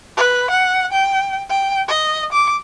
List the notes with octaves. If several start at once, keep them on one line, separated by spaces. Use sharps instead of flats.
B4
F#5
G5
G5
D#5
D6